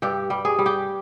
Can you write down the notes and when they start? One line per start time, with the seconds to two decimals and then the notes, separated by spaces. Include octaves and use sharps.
0.02 G2 G4
0.30 G3
0.45 G#4
0.59 G3
0.66 G4